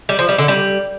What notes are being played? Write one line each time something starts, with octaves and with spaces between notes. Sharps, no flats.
G3
F3
G3
D3
G3